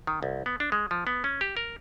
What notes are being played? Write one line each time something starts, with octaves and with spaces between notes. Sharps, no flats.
D#3
C2
B3
D4
G#3
F3
B3
C#4
G4
A#4